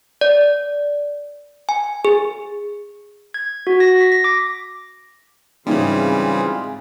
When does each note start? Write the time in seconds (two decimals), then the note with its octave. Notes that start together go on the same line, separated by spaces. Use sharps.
0.21 D5
1.69 G#5
2.05 G#4
3.34 G#6
3.67 F#4
3.80 A#6
4.00 B6
4.12 A#6
4.24 D6
5.67 G#2 C#3 E3 G3 C4 D#4 F4 G#4